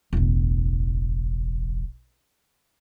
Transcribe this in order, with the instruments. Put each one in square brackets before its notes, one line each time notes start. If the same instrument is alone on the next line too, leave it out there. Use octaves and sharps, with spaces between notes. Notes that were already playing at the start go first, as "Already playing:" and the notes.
[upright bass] E1 A1